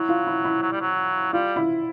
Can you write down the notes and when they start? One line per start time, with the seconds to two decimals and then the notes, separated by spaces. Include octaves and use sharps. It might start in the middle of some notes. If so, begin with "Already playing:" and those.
Already playing: F#3 E4
0.09 F4
0.27 E4
0.45 E4
0.62 F#3
0.72 G3
0.81 F#3
1.33 G3 F4
1.56 E4